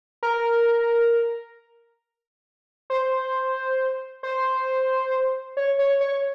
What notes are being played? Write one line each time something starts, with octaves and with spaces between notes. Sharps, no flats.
A#4
C5
C5
C#5
C#5
C#5